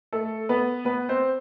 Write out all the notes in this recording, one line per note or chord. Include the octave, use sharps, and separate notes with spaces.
A3 A4
B3 B4
B3 B4
C4 C5